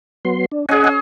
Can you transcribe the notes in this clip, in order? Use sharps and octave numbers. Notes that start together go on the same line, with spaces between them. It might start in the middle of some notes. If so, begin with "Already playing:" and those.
F#3 B3 C6
D4
C#4 G#4 D#5 F#5 G#5
G#4